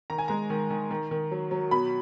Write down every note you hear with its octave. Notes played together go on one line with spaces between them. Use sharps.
D#3 A#5
G#5
G#3 A#5
D#3
D#3
D#3
D#3
F#3
F#3
B2 B5